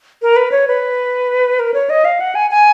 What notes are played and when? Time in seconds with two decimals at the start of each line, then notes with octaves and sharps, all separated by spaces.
0.22 A#4
0.36 B4
0.52 C#5
0.68 B4
1.59 A#4
1.74 C#5
1.90 D#5
2.05 F5
2.20 F#5
2.35 G#5
2.51 G#5